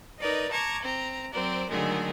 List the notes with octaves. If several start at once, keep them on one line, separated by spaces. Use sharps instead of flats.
D#4 A#4 B4 D5 D#5
A5 A#5 C#6 D6 G#6
C4 A#5
F#3 C4 A#4 C5 D5
D3 D#3 F#3 G#3 A3 G#4